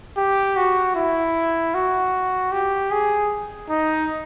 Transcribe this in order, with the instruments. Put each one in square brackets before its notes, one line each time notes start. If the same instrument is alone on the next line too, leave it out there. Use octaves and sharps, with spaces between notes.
[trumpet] G4
F#4
E4
F#4
G4
G#4
D#4